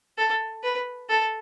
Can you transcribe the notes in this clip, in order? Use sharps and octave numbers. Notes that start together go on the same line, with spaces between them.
A4
B4
A4